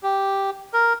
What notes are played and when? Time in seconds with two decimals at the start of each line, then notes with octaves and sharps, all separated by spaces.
0.03 G4
0.73 A#4